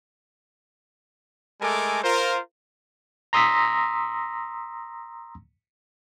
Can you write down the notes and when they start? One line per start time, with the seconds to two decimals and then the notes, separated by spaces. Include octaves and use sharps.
1.62 G#3 A3 A4 A#4 G#5 D6
2.04 F4 A#4 C5
3.33 A#5 C6 D#6 E6 A#6 B6